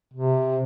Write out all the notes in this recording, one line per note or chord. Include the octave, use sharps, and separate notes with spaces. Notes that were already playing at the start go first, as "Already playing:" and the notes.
C3